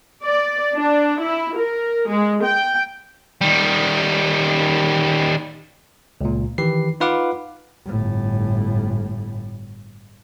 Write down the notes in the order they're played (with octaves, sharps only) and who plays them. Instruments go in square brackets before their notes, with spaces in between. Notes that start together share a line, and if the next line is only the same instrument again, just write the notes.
[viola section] D5
D4
E4
A#4
G#3
G5
[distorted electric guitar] D#3 G3
[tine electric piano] C#2 A#2
D#3 E3 G4 B4 C7
D#4 F4 B4 F5 F#5 D6
[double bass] G1 A2